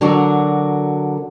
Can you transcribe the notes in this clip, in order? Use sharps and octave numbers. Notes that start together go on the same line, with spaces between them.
D3 F#3 D4 F#4 A#4